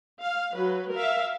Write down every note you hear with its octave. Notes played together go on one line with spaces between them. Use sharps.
F5
F#3 B4
A#4 E5 F5